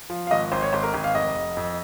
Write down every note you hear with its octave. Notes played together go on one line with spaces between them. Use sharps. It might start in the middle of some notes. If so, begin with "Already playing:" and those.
F3
F5
G#1 D#5
G#1 C5
C#5
G#1 C5
A#4
G#1
F5
F1 D#5
F1
F2